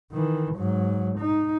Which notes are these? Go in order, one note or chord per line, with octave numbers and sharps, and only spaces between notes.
D#3 E3
G#2 F#3
D#4